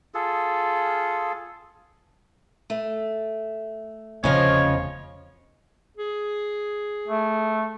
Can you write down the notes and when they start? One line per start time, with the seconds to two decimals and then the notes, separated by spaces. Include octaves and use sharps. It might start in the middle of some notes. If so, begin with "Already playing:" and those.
0.14 F4 G#4 A4
2.70 A3
4.24 F1 E2 C#3 F3 C#5 D#5 F5
5.97 G#4
7.07 A3